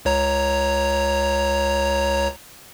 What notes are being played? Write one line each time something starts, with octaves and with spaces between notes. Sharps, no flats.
C#2 C#5 A#5